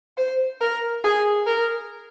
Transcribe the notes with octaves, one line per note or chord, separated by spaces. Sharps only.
C5
A#4
G#4
A#4